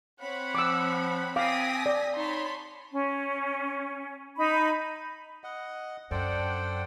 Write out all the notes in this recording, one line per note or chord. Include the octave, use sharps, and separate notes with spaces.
C4 C#5 F#5 B5
F3 D6 E6
C4 F5 G#5 D6 D#6 A#6 B6
D5
D#4 C#5 A5 B5 C6
C#4
D#4 B5
D#5 F#5
F#2 D4 A4 C5 D5 F#5 G5